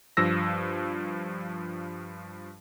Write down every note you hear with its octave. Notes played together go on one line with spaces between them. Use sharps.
G2 F3 E6 A#6